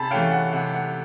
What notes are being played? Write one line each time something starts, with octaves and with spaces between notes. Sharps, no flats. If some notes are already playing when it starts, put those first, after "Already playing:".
Already playing: C3 A5 B5
E3 A3 C#4 F5 G5
F#5
C3 F#5
F#5